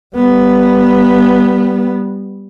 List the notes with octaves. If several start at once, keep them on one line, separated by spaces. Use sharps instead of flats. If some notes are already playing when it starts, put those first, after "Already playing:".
G3 B3